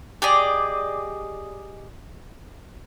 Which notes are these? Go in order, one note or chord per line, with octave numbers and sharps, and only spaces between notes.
G4 G#4 D5 D#5